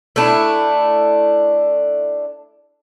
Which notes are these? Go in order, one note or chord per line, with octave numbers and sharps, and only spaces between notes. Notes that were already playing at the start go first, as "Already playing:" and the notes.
A3 D4 E4